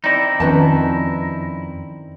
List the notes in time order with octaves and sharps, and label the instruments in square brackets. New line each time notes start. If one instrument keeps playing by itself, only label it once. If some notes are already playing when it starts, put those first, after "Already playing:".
[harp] C4 D5 [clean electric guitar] D#4 E4
[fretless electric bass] F2 [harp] D#3 C4 [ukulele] C#4 B4 A5